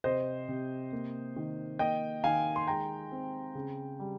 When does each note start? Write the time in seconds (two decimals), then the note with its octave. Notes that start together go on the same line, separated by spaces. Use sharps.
0.04 C3 C5 D#5
0.49 C3
0.93 A#3
1.36 D#3
1.79 A#3 D#5 G5
2.24 D#3 F5 G#5
2.56 C6
2.67 G#3 G5 A#5
3.12 C4
3.55 C#3
4.00 G3